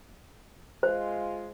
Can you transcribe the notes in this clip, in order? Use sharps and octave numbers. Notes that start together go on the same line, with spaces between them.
G#3 F4 C5